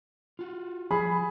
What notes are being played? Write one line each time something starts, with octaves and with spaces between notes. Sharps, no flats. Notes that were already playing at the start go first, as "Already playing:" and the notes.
F4 F#4
F3 G3 G#4 B5